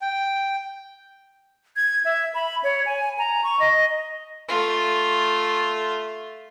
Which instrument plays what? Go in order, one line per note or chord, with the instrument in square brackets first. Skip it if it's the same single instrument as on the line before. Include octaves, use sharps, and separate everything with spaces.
[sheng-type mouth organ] G5
[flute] G#6
E5
B5
C#5
G#5
A#5
C#6
D#5
[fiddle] A3 F4